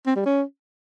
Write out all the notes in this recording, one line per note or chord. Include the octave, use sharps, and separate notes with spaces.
C4
G3
C#4